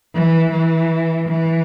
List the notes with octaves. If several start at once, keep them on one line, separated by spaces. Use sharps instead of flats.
E3
E3
E3